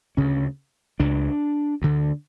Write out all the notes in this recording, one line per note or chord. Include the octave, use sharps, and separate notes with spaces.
D2 C#3 C#4
C#2 C#3 D4
D2 D3